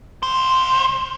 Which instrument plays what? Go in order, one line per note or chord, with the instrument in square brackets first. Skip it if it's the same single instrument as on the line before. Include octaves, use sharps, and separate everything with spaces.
[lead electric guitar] C2 C5